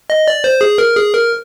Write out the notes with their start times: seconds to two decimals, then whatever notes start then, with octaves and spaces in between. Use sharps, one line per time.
0.10 D#5
0.28 D5
0.44 C5
0.61 G#4
0.78 A#4
0.95 G#4
1.13 A#4